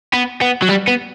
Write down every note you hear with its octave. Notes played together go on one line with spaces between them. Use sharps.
B3
B3
F#3
G3
B3